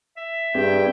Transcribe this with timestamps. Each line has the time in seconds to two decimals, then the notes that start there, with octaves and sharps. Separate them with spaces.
0.17 E5
0.55 G2 C4 D4 G#4 G5